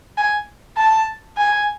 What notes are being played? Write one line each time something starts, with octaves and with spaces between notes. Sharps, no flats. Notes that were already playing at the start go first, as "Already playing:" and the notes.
G#5
A5
G#5